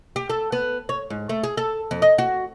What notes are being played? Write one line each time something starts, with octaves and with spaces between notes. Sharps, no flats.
G4
A4
B3
C#5
G#2
A3
G#4
A4
F2
D#5
F#4